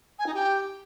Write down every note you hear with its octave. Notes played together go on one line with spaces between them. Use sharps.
G#5
D#4
G4